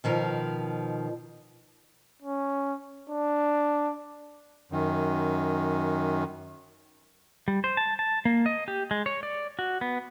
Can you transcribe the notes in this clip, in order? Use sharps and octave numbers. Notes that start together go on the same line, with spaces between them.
B2 D#3 F3
C#4
D4
F#2 D#3
G3
C5
A5
A5
A#3
D#5
G4
G#3
C#5
D5
F#4
B3